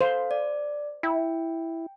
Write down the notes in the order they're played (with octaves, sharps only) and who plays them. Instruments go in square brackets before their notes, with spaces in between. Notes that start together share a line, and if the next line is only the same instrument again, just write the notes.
[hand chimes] A4 F5 [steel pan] C5
[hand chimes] D5
[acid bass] E4 [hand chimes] G5